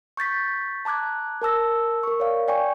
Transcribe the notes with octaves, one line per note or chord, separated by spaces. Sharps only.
C#6 G6 A6 B6
A5 A#5 D6 F#6 G#6
A#4 A5 E6 A#6
A#4 C#6
C#5 D5 F5
D5 G5 G#5 C#6